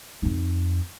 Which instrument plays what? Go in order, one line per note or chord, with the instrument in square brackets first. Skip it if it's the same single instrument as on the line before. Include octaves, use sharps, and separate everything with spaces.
[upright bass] F2 D#4